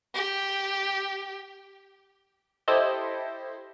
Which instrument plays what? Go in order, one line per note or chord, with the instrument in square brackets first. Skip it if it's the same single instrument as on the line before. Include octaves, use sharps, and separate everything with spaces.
[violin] G4
[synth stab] E4 G4 A4 C5 D#5